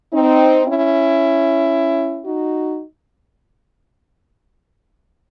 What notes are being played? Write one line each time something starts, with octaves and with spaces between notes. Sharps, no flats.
C4 D#4
C#4 E4
D#4 F#4